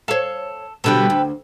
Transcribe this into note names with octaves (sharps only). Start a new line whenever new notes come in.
A4 C#5 F5
B2 D3 G3 A4 B4 G5
D2